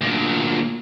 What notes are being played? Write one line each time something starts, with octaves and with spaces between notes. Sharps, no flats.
D2 A#2